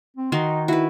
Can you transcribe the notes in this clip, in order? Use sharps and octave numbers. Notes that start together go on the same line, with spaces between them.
C4
D#3 D#4 F#4 C6
E4 F#4 B4